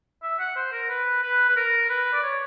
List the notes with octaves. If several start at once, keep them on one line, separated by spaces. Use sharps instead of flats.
E5
F#5
C5
A#4
B4
B4
B4
A#4
B4
D5
C#5